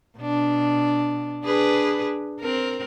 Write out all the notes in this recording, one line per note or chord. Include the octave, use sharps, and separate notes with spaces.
B2 D4
D4 G#4 B4
C4 A#4